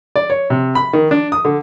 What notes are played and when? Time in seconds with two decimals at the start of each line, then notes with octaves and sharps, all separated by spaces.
0.16 D5
0.30 C#5
0.50 C3
0.75 B5
0.93 D#3
1.11 D4
1.32 D#6
1.45 D3